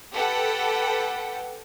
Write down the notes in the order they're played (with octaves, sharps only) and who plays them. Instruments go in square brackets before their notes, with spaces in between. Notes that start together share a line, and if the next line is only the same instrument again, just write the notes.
[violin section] G4 A4 B4 F#5 G5